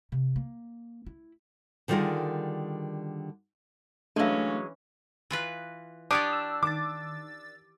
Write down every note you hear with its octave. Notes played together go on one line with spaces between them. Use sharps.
C3
A#3
E4
D3 D#3 G3 F4 G#4 A#4
E3 F#3 G#3 A3 C#4 D4 F5
E3 F4 B4
D4 G4 C#5 D5 D#6
E6
D#3 D6 E6 A6